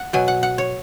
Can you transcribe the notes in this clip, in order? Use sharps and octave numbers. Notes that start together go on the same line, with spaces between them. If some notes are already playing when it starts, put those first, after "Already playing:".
Already playing: F#5
B2 F#3 G#5
F#5
F#5
C#5